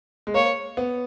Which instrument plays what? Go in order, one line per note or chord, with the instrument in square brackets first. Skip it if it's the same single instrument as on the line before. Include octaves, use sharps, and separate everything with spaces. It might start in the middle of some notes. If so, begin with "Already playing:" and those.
[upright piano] G#3
[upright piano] A#3 [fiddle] C#5
[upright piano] B3